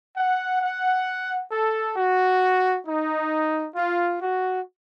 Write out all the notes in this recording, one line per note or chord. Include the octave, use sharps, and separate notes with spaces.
F#5
F#5
A4
F#4
D#4
F4
F#4